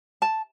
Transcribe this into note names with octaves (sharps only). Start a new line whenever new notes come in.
A5